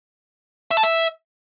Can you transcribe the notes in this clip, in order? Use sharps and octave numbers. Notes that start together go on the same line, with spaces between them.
E5
A5
E5